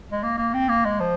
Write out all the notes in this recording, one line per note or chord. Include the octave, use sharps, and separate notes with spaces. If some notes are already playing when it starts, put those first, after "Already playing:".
G#3
A#3
A#3
C4
A#3
G#3
F3